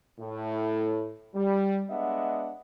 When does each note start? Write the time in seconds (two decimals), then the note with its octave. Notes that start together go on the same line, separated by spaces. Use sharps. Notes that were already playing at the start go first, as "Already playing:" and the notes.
0.20 A2
1.35 G3
1.90 G#3 B3 D4 D#5 E5 F#5